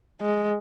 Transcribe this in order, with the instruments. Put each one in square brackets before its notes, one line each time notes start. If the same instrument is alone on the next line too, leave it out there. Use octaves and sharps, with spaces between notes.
[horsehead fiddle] G#3